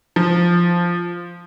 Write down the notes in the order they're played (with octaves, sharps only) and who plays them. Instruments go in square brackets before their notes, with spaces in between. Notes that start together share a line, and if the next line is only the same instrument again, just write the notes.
[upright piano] F3